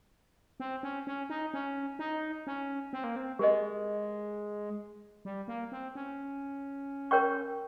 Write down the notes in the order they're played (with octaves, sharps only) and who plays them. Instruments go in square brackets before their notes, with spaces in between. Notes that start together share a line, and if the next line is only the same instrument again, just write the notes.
[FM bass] C4
C#4
C#4
D#4
C#4
D#4
C#4
C4
A#3
C4
[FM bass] G#3 [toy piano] G4 A#4 D#5
[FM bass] G3
A#3
C4
C#4
[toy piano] A#4 C#5 G5 C#6